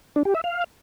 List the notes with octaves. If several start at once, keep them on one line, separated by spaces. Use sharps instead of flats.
D4
G4
E5
F5